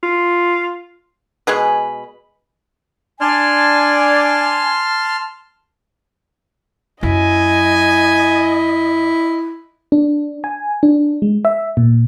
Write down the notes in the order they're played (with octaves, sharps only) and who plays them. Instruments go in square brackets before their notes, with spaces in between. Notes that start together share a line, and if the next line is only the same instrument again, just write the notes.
[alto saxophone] F4
[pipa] B2 G#3 G#4 B4
[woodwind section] D4 D5 G#5 [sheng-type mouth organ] A5 C6 F6
[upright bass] F#2 F#3 [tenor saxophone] E4 [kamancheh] D#5 [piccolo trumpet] G#5
[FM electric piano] D4
G#5
D4
G#3
E5
A#2